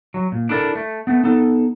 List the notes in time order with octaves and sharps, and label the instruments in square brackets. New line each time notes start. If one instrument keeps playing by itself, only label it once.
[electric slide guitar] F#3
A#2
D4 E4 A4 A#4 D5
A3
A3 B3
B3 D#4 A4